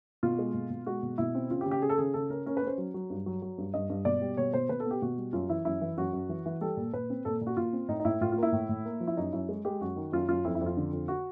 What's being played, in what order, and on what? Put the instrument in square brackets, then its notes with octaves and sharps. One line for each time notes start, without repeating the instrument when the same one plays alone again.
[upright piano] B2 F4
G#3
B2
B2
G#3 F#4
B2
B2 E4
C4
C#3 F4
G4
C#3
G4
C#3 G#4
A4
C#3 G#4
C#3 A4
C#4 A#4
C#4 A#4
B4
C#4 C5
F#3
F#3
G2
F#3
F#3
G2
G2 D#5
G2
B2 D5
G3
B2 C#5
B2 C5
B2 B4
A4
B3
G4
B2 F#4
G3
F#2 F4
E3 E4
F#2 E4
E3
F#2 F#4
F#2
E3
E3
G3 A4
A#2
A#2 B4
C4
A#2 A4
A#2
F#4
A#2 F4
C4
A2 D#4
D#4
A2 E4
A2 F4
F4
A#3 E4
A2
A2
A#3
F3
E4
F#2 D#4
F#2 E4
G#3
G#3 G4
F#2 F#4
D#3
F#2 F4
F#2 F4
F2 E4
E4
F2
F4
D3
F2
F#4